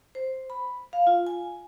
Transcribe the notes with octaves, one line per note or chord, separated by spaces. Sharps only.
C5
B5
F5
F4
G#5